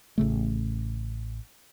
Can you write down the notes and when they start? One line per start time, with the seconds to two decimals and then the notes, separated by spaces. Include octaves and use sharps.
0.18 A1 C#3 A3